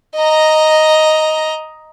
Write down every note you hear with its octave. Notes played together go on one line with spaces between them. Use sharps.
D#5 A#5